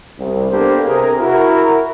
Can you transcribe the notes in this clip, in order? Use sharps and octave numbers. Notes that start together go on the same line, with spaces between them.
C2
A#3 B3 D4 G4 A4 C5
C3 G#4 A#4
E4 F#4 A#4